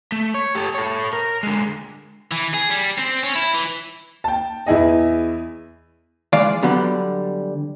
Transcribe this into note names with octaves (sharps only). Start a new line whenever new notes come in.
A3
C#5
G4 A4
A4 C#5
A#4
D3 G#3
E3
G#4
G3
C4
C#4
E4
E3
G5 A5
E2 E4 G#4 D#5
E3 G#3 D5 F5
D3 F#3 G3 B3